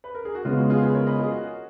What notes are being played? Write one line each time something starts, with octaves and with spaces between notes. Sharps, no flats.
B4
A#4
G#4
F#4
C#3 G#3 B3 F4
F#4
F4 G#4
G#4 B4
A#4 C#5
B4 D#5
F4 G#4
F#4